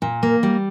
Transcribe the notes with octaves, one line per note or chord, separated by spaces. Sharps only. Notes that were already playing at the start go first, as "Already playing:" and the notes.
A#2
A#3
G3